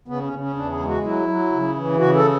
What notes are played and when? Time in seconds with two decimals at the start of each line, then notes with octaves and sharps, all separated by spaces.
0.08 C#3 B3
0.24 C#4
0.33 C#3
0.41 C#4
0.56 E2 D4
0.72 G#4
0.80 G#3
0.88 F#4
1.04 F#3 E4
1.28 F#3
1.52 C#3
1.77 E3
1.99 C#3 F#4
2.15 A4